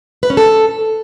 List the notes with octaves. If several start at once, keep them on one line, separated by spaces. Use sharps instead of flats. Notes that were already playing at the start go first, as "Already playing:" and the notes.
B4
C#4
A4